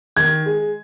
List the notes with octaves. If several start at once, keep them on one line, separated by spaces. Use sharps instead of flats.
D#3 G#6
G#3